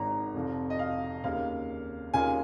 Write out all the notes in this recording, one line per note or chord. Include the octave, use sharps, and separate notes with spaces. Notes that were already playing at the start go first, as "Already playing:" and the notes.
Already playing: G#1 G#2 D#3 C#4 A#5
F1 F2 F3
D#5
F5
D#2 C#3 A#3 F5
D#2 C#3 A#3 F4 G#5